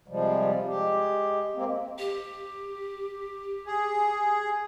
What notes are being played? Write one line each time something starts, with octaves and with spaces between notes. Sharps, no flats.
C3 F3 G3 G#3
G#3 G4
G#3 A#3 C4
G4
G#4